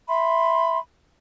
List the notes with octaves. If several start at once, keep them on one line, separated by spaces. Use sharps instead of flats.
E5 B5 C6